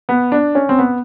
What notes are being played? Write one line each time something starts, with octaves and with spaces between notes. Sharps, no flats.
B3
D4
C#4
C4
B3